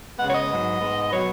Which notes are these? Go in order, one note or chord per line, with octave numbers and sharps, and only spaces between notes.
C#3 G#3 B3 F#5
C#5
D#5
G#2 F#3 B3
G#2 G#3 B3
B2 F#3 B3 C#5